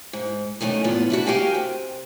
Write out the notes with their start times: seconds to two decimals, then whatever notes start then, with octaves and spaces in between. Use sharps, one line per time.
0.13 G#2
0.61 F#2 D#3 A3 G#5
0.84 E2 A2 B3 F4
1.10 D4 E4 F#4
1.27 F#4 G4 A#4 F5 G5 G#5
1.54 C3